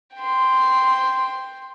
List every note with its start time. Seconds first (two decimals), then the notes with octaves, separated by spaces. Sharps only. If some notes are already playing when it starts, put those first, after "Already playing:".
0.15 G5 C6